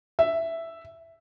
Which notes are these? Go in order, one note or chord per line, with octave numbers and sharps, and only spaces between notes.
E5